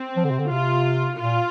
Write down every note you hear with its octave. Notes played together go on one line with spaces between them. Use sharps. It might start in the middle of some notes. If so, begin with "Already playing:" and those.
Already playing: C4
F3
D3
C3
D3
C3 F4
A#2 F4